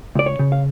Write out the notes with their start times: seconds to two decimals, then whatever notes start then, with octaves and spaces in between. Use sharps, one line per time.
0.15 C#2 D5
0.26 C#5
0.39 C#3
0.52 F5